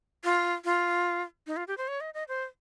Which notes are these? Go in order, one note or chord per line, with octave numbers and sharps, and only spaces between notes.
F4
F4
D#4
F4
G4
C5
C#5
D#5
D#5
C5